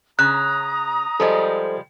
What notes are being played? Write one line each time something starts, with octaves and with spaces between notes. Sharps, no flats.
C#3 A#5 D#6 F#6
F3 G3 G#3 A4 C5 D#5